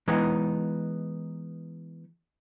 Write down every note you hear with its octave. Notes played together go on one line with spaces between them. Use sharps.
E3 G#3 B3 D#4